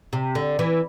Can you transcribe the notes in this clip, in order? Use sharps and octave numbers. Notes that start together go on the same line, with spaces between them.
C3
D3
E3